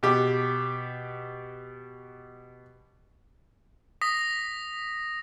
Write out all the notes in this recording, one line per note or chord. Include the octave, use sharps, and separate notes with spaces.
B2 G4
D#6 A#6 B6